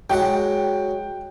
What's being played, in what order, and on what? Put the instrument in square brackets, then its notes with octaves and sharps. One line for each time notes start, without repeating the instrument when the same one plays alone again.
[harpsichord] F#3 G#3 F#5 [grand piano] G5